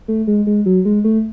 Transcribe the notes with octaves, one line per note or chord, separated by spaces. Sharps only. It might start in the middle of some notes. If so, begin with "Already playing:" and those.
A3
G#3
G#3
F#3
G#3
A3